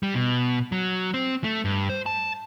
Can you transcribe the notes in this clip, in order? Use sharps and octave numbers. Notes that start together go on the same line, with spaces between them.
G3
B2
F#3
C4
A3
G2
C5
A5